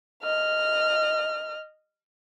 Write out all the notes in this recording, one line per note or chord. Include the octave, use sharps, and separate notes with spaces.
D#5 F6